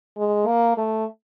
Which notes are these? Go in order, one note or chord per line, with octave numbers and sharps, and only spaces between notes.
G#3
A#3
A3